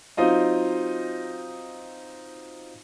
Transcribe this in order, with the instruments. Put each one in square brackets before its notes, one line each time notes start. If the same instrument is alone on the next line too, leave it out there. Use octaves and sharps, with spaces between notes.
[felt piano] F#3 C4 D#4 F4 D#5 F5